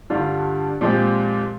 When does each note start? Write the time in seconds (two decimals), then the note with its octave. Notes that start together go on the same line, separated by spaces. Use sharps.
0.10 G2 D3 G3 D4 F4
0.81 A#2 F3 G#3 C4 G4